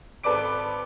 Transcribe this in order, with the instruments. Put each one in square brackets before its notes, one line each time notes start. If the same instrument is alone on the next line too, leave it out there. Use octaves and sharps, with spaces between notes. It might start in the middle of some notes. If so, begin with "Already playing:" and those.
[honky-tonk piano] G#1 A4 B4 D5 D6 D7